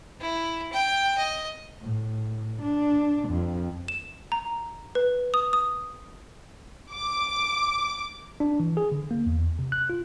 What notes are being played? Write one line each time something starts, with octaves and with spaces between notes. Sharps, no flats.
E4
G5
D#5
A2
D4
F2
E7
A#5
B4
D#6
D#6
D6
D4
E3
G#4
D3
A#3
E2
C3
F#6
F4